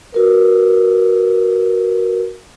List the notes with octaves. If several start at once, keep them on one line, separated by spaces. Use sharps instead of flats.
F#4 A#4 B4